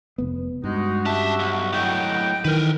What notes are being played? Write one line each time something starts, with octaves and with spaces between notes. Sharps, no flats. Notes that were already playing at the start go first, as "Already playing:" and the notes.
F1 B3
G2 G#3 D#4 F#4
C#4 G4 E5 A5
B1
A2 F#3 D#5 F#5 G5
D#3 E3 A#4 B4